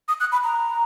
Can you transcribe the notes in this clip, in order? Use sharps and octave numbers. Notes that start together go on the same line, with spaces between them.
D#6
F#6
B5
A#5